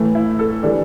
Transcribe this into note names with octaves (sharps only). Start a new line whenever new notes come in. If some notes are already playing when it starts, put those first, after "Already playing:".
Already playing: A2 E3 A3
E4
A4
E3 G3 D4 A4